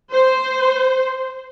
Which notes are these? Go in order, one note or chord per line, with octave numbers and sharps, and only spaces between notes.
C5